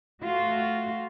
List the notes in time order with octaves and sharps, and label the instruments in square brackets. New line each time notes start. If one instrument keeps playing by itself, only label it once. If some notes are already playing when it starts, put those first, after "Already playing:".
[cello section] A3 F4 F#4